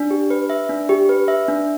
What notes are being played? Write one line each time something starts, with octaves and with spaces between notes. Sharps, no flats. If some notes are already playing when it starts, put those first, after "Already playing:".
Already playing: D4
G4
B4
E5
D4
G4
B4
E5
D4